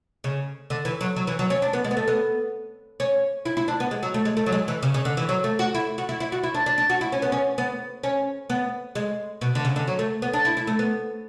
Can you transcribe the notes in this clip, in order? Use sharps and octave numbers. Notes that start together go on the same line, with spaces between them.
C#3
D3
E3
F#3
F#3
E3
F#3
C#4
D4
B3
G#3
B3
A3
B3
C#4
E4
E4
D4
B3
G#3
F#3
A3
G#3
A3
F#3
G#3
E3
C#3
C#3
D3
E3
F#3
A3
F#4
E4
F#4
E4
E4
F#4
E4
D4
D4
D4
F#4
E4
C#4
B3
C#4
B3
C#4
B3
G#3
B2
D3
C#3
D3
F#3
A3
B3
D4
E4
E4
A3
B3